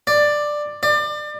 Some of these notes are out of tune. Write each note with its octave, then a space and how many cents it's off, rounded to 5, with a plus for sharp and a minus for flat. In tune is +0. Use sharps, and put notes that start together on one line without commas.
D5 +10
D5 +30